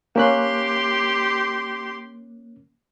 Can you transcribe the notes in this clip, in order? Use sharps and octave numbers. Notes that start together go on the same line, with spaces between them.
A#3 C#4 G4 C6 F#6